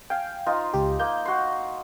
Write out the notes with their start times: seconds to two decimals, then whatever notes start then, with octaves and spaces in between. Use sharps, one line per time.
0.10 F5 G5 G#5
0.46 D#4 F4 C5
0.73 C#2 G4
1.00 A#3 G6
1.25 F#4 C6